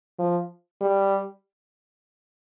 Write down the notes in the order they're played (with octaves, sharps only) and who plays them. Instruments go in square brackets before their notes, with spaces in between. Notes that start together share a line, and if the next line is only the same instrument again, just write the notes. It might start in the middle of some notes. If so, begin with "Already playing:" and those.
[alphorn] F3
G3